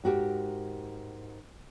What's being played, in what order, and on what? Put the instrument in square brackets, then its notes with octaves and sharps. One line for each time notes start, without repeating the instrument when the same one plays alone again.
[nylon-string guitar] G#2 F#4 G4 A#4